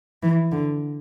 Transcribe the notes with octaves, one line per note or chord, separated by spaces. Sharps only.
E3
D3